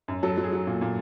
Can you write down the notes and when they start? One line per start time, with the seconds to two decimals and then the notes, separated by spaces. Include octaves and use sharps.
0.08 F#2
0.23 F#3 A4
0.38 F#3
0.44 G#4
0.53 F#3
0.67 A#2
0.81 A#2